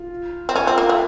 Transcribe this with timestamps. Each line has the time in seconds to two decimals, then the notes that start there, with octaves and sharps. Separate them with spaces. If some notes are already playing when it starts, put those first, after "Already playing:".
Already playing: F4
0.49 C4
0.55 C#4 F4
0.67 C4
0.78 A#3
0.89 A3